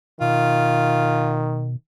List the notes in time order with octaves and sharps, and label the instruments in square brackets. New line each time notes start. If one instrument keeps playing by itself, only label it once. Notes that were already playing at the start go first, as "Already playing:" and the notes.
[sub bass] B2 [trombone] D#3 [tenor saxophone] F4